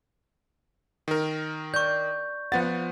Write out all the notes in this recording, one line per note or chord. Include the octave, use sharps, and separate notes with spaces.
D#3 A#4
D5 C#6 G6
F3 B3 F4 C5 F#5 A6